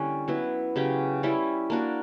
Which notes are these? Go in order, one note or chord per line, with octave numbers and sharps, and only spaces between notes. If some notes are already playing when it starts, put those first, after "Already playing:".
Already playing: D3 G3 A#3 C#4 E4
F#3 B3 E4 B4
C#3 F#3 C#4 G4
G3 C#4 E4
A#3 D4 F#4